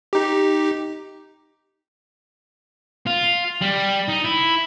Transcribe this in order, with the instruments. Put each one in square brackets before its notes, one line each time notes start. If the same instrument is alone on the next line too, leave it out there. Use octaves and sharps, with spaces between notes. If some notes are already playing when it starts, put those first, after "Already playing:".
[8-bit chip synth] D#4 G4
[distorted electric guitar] F4
G3
D#4
E4